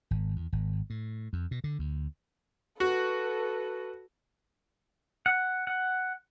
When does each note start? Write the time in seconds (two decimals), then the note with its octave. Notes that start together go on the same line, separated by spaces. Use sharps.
0.11 G#1
0.36 E2
0.52 G#1
0.90 A2
1.33 F2
1.51 B2
1.64 D3
1.79 D2
2.80 F#4 A4 B4
5.26 F#5
5.67 F#5